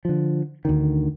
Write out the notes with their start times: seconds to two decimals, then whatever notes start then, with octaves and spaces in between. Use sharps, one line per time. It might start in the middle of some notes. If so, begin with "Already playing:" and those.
0.05 D3 F3
0.65 D2 D3 D#3